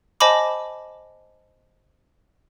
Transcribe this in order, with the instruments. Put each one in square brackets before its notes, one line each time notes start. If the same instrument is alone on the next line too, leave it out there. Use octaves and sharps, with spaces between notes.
[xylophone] C5 D#5 G#5 A5 B5 D6